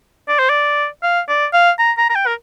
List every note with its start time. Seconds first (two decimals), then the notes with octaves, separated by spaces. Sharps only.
0.28 D5
0.39 C5
0.50 D5
1.03 F5
1.28 D5
1.53 F5
1.79 A#5
1.97 A#5
2.10 A#5
2.15 G5
2.26 A#4